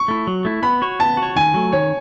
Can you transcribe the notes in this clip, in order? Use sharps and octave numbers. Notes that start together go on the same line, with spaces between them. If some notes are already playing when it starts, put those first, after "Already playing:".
Already playing: C#6
A3 E4
F#3
A3 E4
B3 B5
F#4 C#5
B3 A5
F#4
C#5
D#3 G#5
F#3 A3
D#3 C#5